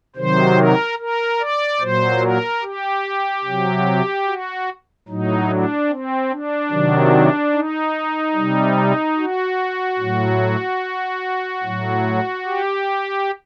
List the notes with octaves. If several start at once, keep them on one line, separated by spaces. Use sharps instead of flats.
C3 D#3 F#3 C5
A#4
A#4
D5
A#2 F#3 C5
A#4
G4
C3 F#3
F#4
A2 F#3 D#4
D4
C4
D4
C3 D#3 F#3
D#4
C3 G3
F#4
A2 F#3
A2 F#3
G4